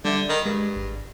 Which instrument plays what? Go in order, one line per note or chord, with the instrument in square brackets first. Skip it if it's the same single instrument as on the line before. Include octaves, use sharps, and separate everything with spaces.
[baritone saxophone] D3 [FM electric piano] G3 E5
[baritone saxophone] D#3 [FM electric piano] A#5 B5
[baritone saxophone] G2 [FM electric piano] G#3
[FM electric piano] G#1